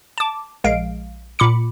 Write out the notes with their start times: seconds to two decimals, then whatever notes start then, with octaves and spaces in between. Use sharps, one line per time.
0.18 A5 D6
0.64 A#1 G#3 F5 D7
1.39 A#2 B5 D6 C#7